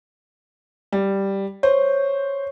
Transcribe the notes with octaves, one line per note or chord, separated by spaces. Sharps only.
G3
C5 C#5